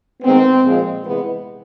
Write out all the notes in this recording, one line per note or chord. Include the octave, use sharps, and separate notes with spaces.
D#3 G#3 B3 C4
A#2 F3 G#3
C3 E3 G#3 B3